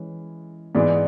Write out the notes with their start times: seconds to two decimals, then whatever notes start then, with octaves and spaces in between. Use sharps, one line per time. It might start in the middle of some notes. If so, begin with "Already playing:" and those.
Already playing: E3 G#3 C#4
0.75 G#2 E3 G#3 B3 D5